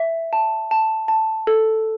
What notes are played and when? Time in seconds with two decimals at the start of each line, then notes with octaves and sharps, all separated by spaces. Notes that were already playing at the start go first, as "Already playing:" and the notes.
Already playing: E5
0.33 A5
0.71 A5
1.08 A5
1.47 A4